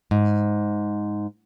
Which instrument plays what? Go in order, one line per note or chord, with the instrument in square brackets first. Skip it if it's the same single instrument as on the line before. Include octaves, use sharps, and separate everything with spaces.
[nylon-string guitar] G#2